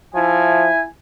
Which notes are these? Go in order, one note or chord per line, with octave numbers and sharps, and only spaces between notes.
F3 E4 E5 G#5